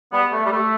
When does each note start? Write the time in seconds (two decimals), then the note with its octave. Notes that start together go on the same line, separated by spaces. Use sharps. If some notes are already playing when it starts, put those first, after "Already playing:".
0.13 G3 B3
0.33 A3
0.45 G3
0.52 A3